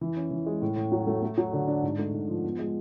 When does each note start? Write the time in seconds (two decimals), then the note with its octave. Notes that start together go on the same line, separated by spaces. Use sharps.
0.01 E3
0.16 C#4
0.31 E3
0.46 G#3
0.62 A2
0.76 A2
0.92 F#3
1.07 A3
1.23 A3
1.38 F#3
1.53 D3
1.68 D4
1.83 G#2
1.98 A3
2.13 G#2
2.28 F3
2.43 B3
2.59 G#3